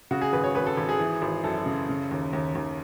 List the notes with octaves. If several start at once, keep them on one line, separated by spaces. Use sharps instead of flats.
C#3 F#4
G#4
G#1 B4
C#5
G#1 B4
A4
G#1
G#4
E3
G#1
F#2 A4
C#3
C#3
D#2
D#2
D#2